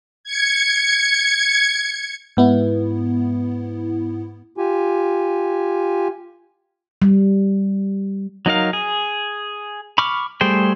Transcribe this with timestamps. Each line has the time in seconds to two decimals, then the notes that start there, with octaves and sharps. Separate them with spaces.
0.24 G#6 C#7
2.37 G#2 B3 E4
4.58 F4 G4 G#5
7.02 G3
8.46 F#3 D#4 A#4 F5
8.73 G#4
9.98 B5 C#6 D6 F6
10.41 G3 A3 G#4 C5 G5